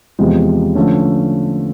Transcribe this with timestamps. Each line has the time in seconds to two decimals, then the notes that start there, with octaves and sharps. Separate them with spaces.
0.19 E2 C3 F3 G#3
0.75 D3 F3 A3 C#4